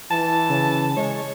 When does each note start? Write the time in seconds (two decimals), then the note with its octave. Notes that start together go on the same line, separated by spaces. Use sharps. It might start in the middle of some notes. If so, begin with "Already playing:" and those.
0.11 E3 A5
0.49 C#3
0.97 G#3 C#5